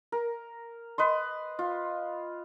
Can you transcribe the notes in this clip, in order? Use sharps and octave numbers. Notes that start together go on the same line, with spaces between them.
A#4
B4 D#5 C6
F4